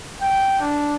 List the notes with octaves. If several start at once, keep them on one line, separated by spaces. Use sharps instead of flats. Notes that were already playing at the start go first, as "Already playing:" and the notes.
G5
D4